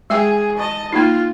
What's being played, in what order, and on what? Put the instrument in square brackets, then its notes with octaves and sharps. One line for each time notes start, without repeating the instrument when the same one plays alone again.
[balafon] G#3 E5 G5 [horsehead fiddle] G#4
[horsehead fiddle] D#5 A5
[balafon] A#3 D#4 [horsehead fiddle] F4